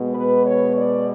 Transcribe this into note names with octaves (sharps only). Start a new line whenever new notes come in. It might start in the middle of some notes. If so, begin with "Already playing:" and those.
Already playing: B2 G#3 B3
B4
C#5
D5